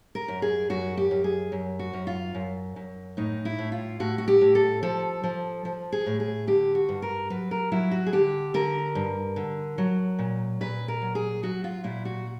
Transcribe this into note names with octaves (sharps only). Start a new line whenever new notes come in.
A#4
F#2
G#4
F#2 F#4
G4
F#2
G#4
F#2
F#4
F#2
F4
F#2
F#2
A2 D#4
E4
A2
F4
A2 F#4
F#4
G4
A2
A4
F3 A4
F3
F3
G#4
A2
G#4
D3 G4
F#4
G2
A#4
F#3 B4
A#4
F#3 E4
F#4
G#4
D3 G4
D3 A#4
G2
D3
F#3
A#2
A#2 B4
A#4
F#3
G#4
F#3 F#4
F4
A#2 E4
F#4